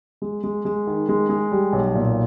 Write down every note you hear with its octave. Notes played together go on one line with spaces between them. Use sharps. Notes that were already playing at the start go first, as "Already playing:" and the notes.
G#3
G#3
G#3
D#3
G#3
G#3
G3
B1
A#2